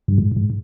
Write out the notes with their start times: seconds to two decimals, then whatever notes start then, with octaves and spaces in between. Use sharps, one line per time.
0.08 G2
0.18 G#2
0.36 G#2